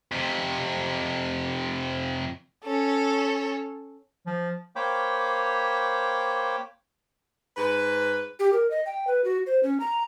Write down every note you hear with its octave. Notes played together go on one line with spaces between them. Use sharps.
F2 C3
C#4 A4
F3
A#3 C5 C#5 G5 B5 D6
G#2 B4
G4
A#4
D#5
G5
B4
F#4
C5
C#4
A#5